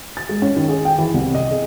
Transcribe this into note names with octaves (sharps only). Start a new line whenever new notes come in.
A6
G#3
C#4
D#3
G#4
G5
E3
C2
D#5
G#4